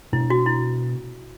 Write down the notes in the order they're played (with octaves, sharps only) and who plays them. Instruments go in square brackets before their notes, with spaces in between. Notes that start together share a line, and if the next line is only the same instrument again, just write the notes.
[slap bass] B2 A3 D4 [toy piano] E4
[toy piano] F#4
E4